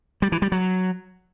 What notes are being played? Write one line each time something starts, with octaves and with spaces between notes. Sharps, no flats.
G3
E3
G3
F#3